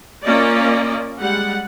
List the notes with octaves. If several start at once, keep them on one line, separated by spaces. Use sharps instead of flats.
A#3 C#4 F4 D5 D#5
G3 G#3 F#5